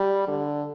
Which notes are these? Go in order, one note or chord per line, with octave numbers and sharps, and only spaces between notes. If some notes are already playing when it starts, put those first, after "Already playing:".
Already playing: G3
D3